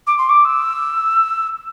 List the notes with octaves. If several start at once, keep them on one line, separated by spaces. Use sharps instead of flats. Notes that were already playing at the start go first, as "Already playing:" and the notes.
D6
C6
D6
E6